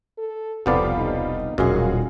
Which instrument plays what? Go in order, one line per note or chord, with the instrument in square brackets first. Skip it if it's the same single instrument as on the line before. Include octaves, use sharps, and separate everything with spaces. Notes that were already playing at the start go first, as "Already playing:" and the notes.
[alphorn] A4
[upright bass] E1 [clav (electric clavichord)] C2 B3 D5 [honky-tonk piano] F3 G3 F4 [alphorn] A4
[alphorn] D#4
[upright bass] D#1 B2 [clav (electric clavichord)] F#2 [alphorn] D#4 [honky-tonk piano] F4 F#4 G#4